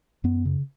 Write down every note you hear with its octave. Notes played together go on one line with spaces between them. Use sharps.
F#2 B3
C#3